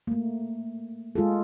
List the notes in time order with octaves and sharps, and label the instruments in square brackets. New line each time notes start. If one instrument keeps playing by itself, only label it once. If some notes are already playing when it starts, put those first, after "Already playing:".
[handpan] A3 A#3
G#3 F4 G#4 A4